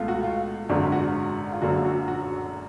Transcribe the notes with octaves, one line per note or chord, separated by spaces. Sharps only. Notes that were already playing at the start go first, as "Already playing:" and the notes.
Already playing: C#2 B2 A3 F4
F#4
F4
G#1 F#2 D3 G#3 D4
F#4
F4
F#1 F#2 D3 F#4
F#4
F#4